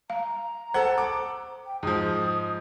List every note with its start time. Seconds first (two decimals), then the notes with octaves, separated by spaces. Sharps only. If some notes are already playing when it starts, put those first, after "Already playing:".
0.10 F5 A#5
0.74 A4 C5 F#5
0.98 D6
1.66 G5
1.83 G#2 F3 D#6